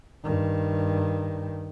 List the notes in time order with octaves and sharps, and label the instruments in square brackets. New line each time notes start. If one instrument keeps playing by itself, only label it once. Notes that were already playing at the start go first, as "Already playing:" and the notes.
[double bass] G2 D#3